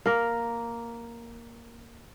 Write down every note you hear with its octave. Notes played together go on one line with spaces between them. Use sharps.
A#3 A#4